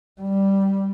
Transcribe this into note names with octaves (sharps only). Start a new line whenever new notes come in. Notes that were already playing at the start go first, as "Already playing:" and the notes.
G3